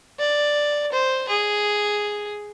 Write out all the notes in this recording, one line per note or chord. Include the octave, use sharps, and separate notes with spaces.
D5
C5
G#4